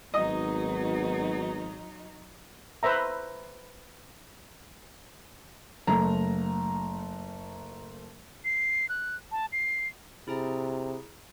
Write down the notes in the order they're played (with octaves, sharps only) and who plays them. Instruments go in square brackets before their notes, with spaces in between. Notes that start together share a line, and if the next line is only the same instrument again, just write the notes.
[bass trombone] G#1 [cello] F#3 D#4 [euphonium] B3 [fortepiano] D#5
[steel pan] B4 C5 E5 A#5
[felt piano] F#1 A3 A#5
[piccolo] C7
F#6
A5
C7
[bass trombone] C3 [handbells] E4 G#4 A#5